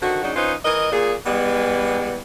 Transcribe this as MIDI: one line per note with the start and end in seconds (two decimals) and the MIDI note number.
0.02 0.21 50
0.02 0.21 51
0.02 0.21 60
0.02 0.21 66
0.23 0.31 49
0.23 0.31 54
0.23 0.31 62
0.23 0.31 63
0.23 0.31 66
0.36 0.54 61
0.36 0.54 63
0.36 0.54 65
0.36 0.54 71
0.36 0.54 72
0.65 0.91 52
0.65 0.91 70
0.65 0.91 75
0.92 1.14 46
0.92 1.14 68
1.26 2.20 52
1.26 2.20 55
1.26 2.20 56
1.26 2.20 59